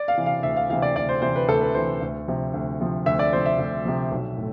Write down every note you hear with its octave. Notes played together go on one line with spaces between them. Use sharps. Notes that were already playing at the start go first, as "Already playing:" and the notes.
Already playing: D5
F5
C3 E3
F5
D2 E5
F5
C3 E3 F5
D5
D2 D5
C5
C3 E3 C5
B4
D2 A4
B4
C3 E3 C5
D2
C3 F3
D2
C3 F3
D2 E5
D5
C3 F3 C5
E5
D2
C3 F3
B1
A2